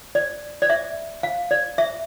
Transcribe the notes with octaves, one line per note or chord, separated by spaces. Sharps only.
D5
D5
E5
F5
D5
E5